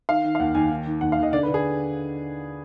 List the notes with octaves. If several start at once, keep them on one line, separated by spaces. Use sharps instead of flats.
D#3 F5
D#3
F5
D#2 F#5
D#2 G#5
D#3
D#3
D#2 F#5
F5
D#2
D#5
D3 D5
B4
D3
G#4